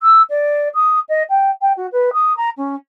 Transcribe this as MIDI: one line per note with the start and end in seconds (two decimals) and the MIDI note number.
0.01 0.22 88
0.30 0.68 74
0.74 1.00 87
1.09 1.23 75
1.29 1.50 79
1.61 1.72 79
1.76 1.87 66
1.92 2.13 71
2.13 2.35 87
2.37 2.49 82
2.57 2.75 61